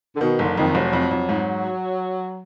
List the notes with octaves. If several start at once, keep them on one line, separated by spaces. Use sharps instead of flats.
D3
B2 D#3
F#1 D3
F2 D#3
F1 F#3
F2
F2
G#2